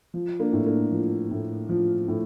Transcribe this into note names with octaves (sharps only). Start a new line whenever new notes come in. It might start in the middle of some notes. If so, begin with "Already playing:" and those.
F3
A#3 D4
A2
A#3 D4
F3
A2
F3
A2